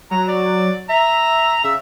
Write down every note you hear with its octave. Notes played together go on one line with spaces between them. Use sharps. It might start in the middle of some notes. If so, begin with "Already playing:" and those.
F#3 A#5
D5
E5 A#5
C#3 E5